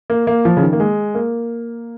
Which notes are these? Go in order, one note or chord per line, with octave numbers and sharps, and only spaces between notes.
A#3
A#3
F3
C#3
D#3
A#3
G#3
A#3